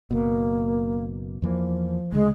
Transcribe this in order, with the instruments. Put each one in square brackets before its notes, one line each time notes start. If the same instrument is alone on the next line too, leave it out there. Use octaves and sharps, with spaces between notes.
[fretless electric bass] F#1 B2 [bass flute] A#3
[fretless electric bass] E2 E3 A#3 [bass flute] F3
[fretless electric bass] D2 C#3 [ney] G#3